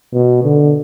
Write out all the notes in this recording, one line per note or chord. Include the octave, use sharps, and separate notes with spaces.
B2
D3